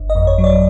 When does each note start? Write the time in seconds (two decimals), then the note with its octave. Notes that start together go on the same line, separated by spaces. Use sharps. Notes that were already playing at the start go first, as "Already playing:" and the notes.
Already playing: G1
0.10 D#5
0.15 F2
0.27 C#5
0.38 F#3
0.44 D5